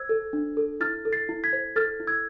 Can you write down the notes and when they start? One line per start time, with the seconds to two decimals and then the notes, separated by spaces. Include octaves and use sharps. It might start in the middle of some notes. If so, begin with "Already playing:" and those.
Already playing: C5 E6 G#6
0.09 A4
0.33 D4
0.57 A4
0.80 E4 F6 A6
1.05 A4
1.13 A6 C7
1.29 E4
1.44 G#6 B6
1.53 C5
1.76 A4 F6 A6
2.00 E4
2.07 E6 G#6